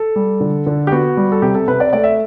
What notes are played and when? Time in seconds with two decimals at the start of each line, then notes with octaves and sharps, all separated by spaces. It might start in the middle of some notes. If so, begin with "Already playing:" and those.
Already playing: A4
0.16 G3
0.40 D3
0.67 D3
0.87 G4
0.92 B3 F#4
1.17 G3
1.32 A4
1.42 C3 G4
1.55 A4
1.68 C3 B4
1.80 D5
1.93 A3 D5
2.04 E5